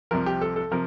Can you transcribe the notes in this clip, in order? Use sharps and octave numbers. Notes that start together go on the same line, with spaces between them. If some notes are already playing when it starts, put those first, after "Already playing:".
C2 C3 F3 A#4
G4
A4
A4
C3 F3 A#4